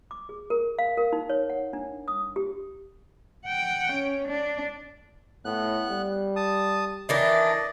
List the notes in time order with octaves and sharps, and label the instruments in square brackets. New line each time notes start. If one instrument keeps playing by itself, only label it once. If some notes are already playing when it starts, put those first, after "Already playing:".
[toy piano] D6
G#4
A#4
F5
A#4
D#4
C#5
F#5
D4
D#6
G4
[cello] F#5 G5
C#4
D4
[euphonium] A2 [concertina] B3 F#6
[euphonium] G3
[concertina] A5 D#6
[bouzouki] D#3 E3 D4 [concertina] D5 D#5